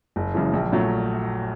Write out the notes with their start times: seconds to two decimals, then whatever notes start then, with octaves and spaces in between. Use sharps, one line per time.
0.16 F#1
0.34 F#2 C#3 E3 G#3
0.53 A#1
0.72 A#2 F#3 A3